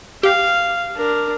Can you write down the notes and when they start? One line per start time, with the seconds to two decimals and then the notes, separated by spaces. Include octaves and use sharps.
0.23 G4 F5
0.95 D4 A#4